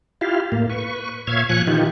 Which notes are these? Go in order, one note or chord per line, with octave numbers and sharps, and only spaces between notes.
E4 F4 G4 F5
A2 A#3
B4 C#6
A#2 C#5 E5 F5 G#6
A#2 F3 G#5 C#6 F#6
D#3 E3 D#4 F4 G4